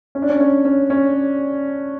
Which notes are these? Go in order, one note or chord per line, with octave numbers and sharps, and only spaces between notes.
C#4
D4
C#4
C#4
C#4
C#4